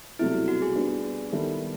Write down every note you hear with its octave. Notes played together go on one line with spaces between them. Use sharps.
C2 B2 F#3 A3 E4
F#4
G#4
G3 B3 D4
D#3 G3 B3 E4 A4